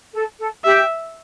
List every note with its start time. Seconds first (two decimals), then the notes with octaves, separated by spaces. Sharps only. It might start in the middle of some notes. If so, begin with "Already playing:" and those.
0.14 A4
0.39 A4
0.64 G4 E5